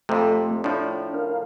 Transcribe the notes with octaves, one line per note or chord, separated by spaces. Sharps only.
F2 C3 A3
A2 F3 D4
A#4 F5